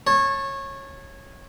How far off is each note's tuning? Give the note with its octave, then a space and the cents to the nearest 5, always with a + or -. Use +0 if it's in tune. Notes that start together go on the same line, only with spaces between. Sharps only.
C#5 -20 A5 +0